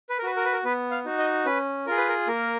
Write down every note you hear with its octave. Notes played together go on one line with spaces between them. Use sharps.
B4
A#4
F#4 B4
A#4
B4
A#4
B3 B4
F5
D#4 F#4
D#5
C#4 B4
F4 G#4 A#4
B4
A#4
A#3 A#4